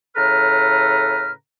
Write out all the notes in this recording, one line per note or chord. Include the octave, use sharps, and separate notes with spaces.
A2 C#3 A4 B4 A#5 F6